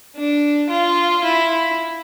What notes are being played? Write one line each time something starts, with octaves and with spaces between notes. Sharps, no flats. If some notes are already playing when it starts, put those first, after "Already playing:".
D4
F4
E4